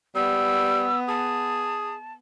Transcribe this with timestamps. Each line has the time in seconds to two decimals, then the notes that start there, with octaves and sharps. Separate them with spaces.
0.15 G3 B3 E6
1.08 G#4 A5